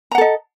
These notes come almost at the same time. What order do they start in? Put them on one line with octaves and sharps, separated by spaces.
A#5 F#5 A4 D#5